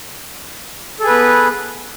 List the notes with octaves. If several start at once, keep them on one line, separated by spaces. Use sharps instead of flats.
B3 G#4 A4 B4